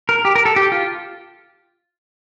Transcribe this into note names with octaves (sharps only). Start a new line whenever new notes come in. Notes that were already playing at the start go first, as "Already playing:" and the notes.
A#4
G4
A#4
A4
G4
F4